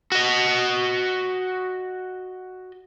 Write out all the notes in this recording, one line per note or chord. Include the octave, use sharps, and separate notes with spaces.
F#4 D#5